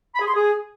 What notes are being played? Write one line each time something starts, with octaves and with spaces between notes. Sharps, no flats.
B5
G#4
C6
G#4